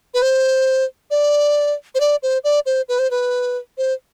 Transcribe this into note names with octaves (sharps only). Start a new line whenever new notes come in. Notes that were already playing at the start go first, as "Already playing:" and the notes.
B4
C5
D5
C5
D5
C5
D5
C5
B4
C5
B4
C5